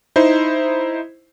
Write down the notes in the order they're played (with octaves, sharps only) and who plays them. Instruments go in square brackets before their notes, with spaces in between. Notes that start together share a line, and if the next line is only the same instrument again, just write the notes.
[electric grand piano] D#4 E4 C5